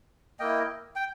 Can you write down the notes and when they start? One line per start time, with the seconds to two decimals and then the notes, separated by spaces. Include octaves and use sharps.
0.40 A#3 E4 D#5 G5
0.96 G5